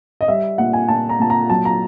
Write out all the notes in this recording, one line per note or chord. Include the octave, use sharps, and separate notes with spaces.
D#5
G3 E5
A#2 F#5
G#5
A#2 A5
A#5
A#2 A5
A#5
F#3 A5
A#5